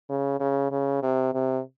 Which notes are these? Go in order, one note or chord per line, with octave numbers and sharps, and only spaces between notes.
C#3
C#3
C#3
C3
C3